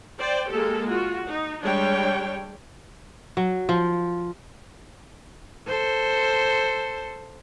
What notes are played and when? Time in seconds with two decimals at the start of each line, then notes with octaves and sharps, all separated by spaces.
0.19 C5 D5 G5
0.48 G#3 A#3 G4 A4
0.89 F4 F#4
1.27 D#4
1.64 G3 G#3 D4 C#5 G5
3.37 F#3
3.69 F3
5.67 A4 C5